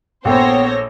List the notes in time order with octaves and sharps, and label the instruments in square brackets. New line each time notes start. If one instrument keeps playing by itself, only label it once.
[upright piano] A#1 A4 [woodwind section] B3 [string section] C5 C#5 A#6 [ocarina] G5